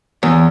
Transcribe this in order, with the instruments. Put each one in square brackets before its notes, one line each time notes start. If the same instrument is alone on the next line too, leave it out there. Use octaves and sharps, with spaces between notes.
[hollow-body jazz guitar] E2